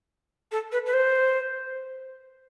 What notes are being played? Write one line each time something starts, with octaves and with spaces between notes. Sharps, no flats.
A4
B4
B4
C5